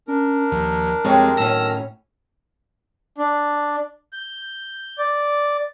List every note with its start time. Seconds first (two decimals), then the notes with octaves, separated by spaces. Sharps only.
0.08 C#4 D4 A#4
0.52 D#2 F3
1.05 F2 G3 G#3 C4 C#5
1.37 A2 D#3 F#3 C#4 A5 E6 F6 A#6
3.18 D4
4.13 G6
4.98 D5